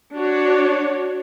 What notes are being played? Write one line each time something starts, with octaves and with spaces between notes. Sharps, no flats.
D4 F#4 C#5